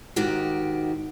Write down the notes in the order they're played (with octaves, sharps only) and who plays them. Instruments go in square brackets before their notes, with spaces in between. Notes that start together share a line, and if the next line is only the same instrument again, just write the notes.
[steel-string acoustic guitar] G#2 D#3 F#4 G4